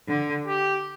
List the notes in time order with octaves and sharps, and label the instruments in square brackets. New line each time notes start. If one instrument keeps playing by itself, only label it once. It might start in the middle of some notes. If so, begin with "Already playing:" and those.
[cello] D3
[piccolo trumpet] G4